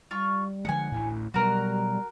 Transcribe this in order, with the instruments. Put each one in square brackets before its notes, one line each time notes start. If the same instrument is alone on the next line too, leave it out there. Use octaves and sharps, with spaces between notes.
[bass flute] G3 [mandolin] F4 C#6
[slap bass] D3 F3 G#3 [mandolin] F#5 G#5
[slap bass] A1 D2 A2 [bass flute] E4
[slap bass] B2 F#3 [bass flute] G3 [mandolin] F#4 A#4